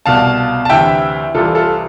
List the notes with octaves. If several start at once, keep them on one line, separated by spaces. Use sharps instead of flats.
C2 B2 F5 A5
A5
D2 C3 E3 E5 G5
C2 C3 E3 F4 A4
F4 A4